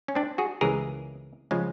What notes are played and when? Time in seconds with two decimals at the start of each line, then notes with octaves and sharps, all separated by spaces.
0.08 C#4
0.15 C4 D4
0.38 F#4 G#4
0.61 C#2 C#3 E3 G#3 G#4 A#4
1.51 C#3 F3 G#3